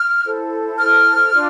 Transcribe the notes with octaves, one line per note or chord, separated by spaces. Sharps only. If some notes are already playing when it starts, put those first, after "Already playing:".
Already playing: F6
E4 A4 C5
F6
D4 F4